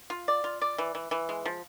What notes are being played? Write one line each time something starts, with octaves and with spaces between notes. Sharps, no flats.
F4
D5
F4
D5
E3
E3
E3
G#3
F3